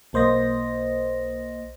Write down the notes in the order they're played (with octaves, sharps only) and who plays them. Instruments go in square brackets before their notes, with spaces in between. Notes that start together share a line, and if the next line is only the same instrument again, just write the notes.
[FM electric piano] B1 A#3 C5 D#5 A#6